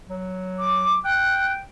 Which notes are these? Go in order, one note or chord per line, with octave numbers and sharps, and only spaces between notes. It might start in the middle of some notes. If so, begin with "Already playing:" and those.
F#3
D6
G5 F#6